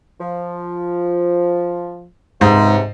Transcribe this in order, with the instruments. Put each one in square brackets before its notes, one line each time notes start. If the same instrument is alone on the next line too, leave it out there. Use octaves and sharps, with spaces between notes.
[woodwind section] F3
[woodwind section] C#2 C3 [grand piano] G#2